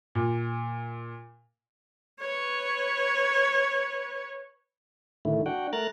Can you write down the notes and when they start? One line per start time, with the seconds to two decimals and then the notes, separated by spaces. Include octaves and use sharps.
0.15 A#2
2.21 B4 C#5
5.25 A2 D3 D#3 A3 E4
5.46 D4 F#4 F#5 G5
5.73 A3 A#4 A#5 F#6 A6